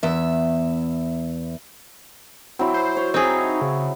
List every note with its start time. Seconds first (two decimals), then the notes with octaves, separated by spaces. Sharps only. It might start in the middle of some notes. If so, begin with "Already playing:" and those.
0.03 E2 E5
2.59 F#3 C4 E4
2.74 C5
2.97 C#5
3.14 C4 D#4 G#4
3.61 C#3